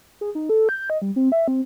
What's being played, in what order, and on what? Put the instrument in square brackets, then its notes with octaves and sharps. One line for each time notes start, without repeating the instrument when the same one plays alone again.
[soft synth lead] G#4
D#4
A4
G6
D#5
G3
C4
E5
C4